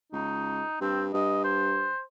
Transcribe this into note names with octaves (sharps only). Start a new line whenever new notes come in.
C#2 D#4
G2 C4
G2 D#5
C5